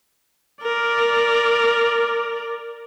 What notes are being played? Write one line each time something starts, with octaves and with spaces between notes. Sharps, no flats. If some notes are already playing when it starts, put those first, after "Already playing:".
A#4 D5